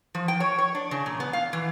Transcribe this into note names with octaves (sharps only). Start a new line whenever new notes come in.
F3
G5
C#5
C#5
D4
C#3
A#2
B3
F5
E3